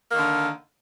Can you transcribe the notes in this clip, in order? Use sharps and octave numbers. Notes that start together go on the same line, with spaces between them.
D3 D#3 A#3